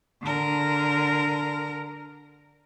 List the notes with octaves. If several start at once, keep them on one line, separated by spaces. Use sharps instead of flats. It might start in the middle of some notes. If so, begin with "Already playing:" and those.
D3 A#4